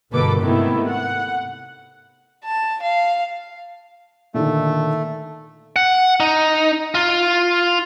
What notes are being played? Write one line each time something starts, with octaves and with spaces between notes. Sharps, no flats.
G1 B2 A#3 A4 B4 D6
G#2 C3 D#3 A3 B3 E4
F#5
A5
F5
A#2 D3 D#3 A3
F#5
D#4
F4